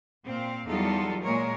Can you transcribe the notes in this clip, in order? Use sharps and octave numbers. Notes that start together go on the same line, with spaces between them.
A#2 C4 F5
E2 F#3 G3 D#4 F4 A4
A#2 G#3 A#4 C#5